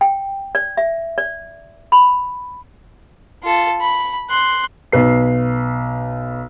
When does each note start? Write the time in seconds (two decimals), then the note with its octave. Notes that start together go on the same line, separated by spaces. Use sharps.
0.01 G5
0.55 D5
0.77 E5
1.18 D5
1.92 B5
3.43 F4 A4
3.80 B5
4.30 C6 F#6
4.92 B1 B4 C7